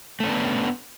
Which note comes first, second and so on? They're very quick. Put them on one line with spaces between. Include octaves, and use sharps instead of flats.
A3 C#4 D4 B3